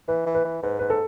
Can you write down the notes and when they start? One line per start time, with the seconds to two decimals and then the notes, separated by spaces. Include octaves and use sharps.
0.08 E3 B4
0.26 E3
0.35 B4
0.45 E3
0.63 G#2 B4
0.79 G#2 B4
0.90 A4